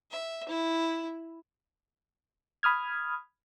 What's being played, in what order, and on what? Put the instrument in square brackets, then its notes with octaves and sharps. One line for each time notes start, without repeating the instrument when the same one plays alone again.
[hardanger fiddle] E5
E4
[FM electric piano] B5 D#6 F6 G#6